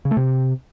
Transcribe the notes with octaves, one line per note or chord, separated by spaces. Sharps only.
C#3
A3
C3